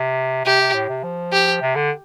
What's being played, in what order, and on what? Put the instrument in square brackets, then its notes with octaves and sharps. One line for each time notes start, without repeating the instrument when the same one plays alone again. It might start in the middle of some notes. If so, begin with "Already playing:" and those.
Already playing: [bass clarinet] C3
[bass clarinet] C3 [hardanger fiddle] G4
[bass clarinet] C3
A2
C3
F3
[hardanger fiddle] G4
[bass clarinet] C3
D3